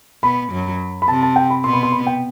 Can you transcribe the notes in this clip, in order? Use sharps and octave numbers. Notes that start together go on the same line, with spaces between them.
B2 B3 B5
F#2 F#3
B5
C3 C4 A5
A5
G5
B5
B2 B3 C6
B5
C6
B5
G5